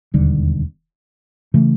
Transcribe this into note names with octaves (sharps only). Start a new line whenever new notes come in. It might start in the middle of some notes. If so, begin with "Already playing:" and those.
E1 D#2 D3 G3
C#3 E3 A3